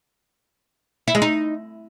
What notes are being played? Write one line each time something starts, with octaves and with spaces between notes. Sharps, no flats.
E4
G#3
D#4